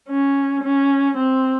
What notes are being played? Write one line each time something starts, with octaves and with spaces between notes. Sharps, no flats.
C#4
C#4
C4